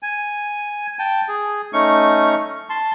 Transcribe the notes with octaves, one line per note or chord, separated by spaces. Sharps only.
G#5
G5 A5
G#4
A3 C#4 D#4 C#6
A5 C6